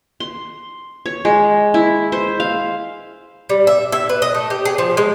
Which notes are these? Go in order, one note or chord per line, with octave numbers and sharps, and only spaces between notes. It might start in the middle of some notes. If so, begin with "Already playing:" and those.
C6
C#5
G#3
E4
C5
F5
G3
E5
E5
B4
D#5
A3
G4
G#4
F3
G#3